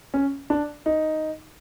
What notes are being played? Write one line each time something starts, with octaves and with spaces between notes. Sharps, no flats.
C#4
D4
D#4